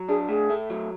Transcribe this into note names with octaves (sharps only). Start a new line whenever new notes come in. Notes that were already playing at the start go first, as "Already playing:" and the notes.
Already playing: F#3
D4 G#4
A2 G#4
A3
F#3